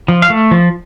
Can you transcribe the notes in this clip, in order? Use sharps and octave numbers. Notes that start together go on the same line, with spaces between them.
F3
F5
A3
F3